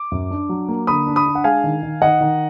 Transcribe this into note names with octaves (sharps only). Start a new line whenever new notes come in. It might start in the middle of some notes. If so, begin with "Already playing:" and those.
Already playing: D6
F#2
D4
F#3
A#3
D3 B5 D#6
D4
B5 D#6
D4
F#5
G#3 F5 G#5
D#3
D#3
D#3 D#5 F#5
D#3